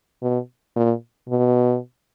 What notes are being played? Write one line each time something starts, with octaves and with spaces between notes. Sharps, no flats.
B2
A#2
B2